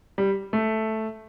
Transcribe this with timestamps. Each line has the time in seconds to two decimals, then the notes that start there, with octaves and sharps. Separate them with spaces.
0.18 G3
0.53 A3